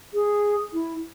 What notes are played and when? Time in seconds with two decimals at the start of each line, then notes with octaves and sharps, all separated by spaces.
0.13 G#4
0.73 E4